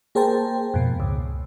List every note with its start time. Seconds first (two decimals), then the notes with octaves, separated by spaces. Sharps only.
0.15 A#3 G#4 A#4 C5 G5 A5
0.74 F2 G#2 B2
1.00 C#2